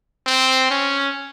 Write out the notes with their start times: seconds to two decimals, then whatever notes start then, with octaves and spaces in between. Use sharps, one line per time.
0.26 C4
0.70 C#4